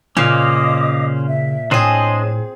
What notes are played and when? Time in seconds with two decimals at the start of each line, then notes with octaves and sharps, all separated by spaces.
0.17 A#2 C#3 C#4 C5 D#5 F5 D6 D#6
1.28 E5
1.71 A2 C4 D4 G#4 C5 C#5 D#5